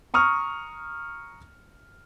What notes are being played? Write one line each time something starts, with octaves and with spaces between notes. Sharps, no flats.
A#5 C#6 D#6 F6